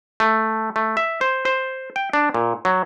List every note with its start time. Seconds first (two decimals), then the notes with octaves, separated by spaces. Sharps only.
0.20 A3
0.76 A3
0.97 E5
1.21 C5
1.45 C5
1.96 G5
2.13 D4
2.34 A#2
2.65 F#3